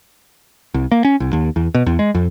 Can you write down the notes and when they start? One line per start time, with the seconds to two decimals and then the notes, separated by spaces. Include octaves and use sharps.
0.74 C2
0.92 A#3
1.05 C#4
1.20 C2
1.33 D#2
1.56 E2
1.75 B2
1.86 E2
1.99 G#3
2.15 F2